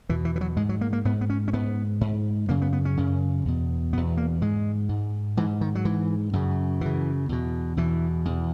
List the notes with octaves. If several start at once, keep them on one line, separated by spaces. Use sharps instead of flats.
E2 B2 E3
E3
E3
F#3
G#2 G#3
F#3
A#3
A#3
G#2 B3
B3
C#4
C#4
G#2 B3
G#2
F#2 C#3 A#3
B3
B3
C#4
F#2 C#3
E2 B2
E2 B2 B3
A#3
G#2 G#3
G#2
G#2 E3
D#3
F#3
G#2 E3
F#2 C#3
F#2 C#3 E3
E2 B2
E2 B2 E3
E2 B2